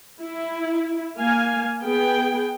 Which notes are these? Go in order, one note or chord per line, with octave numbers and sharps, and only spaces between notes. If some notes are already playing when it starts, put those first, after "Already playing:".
E4
A#3 F5 G#5
B3 G#4 G5